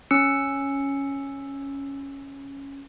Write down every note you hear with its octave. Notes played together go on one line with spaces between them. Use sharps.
C#4 E6 C#7